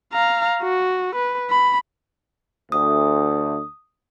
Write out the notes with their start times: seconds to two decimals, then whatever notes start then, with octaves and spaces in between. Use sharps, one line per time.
0.13 F5 A#5
0.63 F#4
1.16 B4
1.50 B5
2.72 D2 D#6